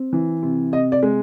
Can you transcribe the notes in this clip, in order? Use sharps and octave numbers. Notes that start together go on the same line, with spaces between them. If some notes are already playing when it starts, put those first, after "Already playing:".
Already playing: C4
E3
C3
C3 D#5
D5
G#3